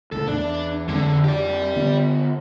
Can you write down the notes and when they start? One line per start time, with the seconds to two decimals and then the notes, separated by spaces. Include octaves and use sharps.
0.12 C#2 A2 A4
0.28 E2 D4
0.89 F2 D3 G#3 D4
1.24 G4 D5
1.76 D3 B3